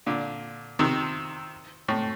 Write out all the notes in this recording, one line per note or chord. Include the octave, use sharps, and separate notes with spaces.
A#2 D3
C3 D#3
A2